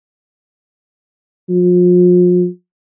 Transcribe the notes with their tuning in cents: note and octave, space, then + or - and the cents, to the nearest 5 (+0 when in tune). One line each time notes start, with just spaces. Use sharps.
F3 +35